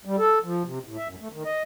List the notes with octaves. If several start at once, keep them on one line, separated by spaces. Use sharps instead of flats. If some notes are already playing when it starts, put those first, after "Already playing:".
G3
A4
F3
C3
A2
E5
F#2
A3
D#3
D#5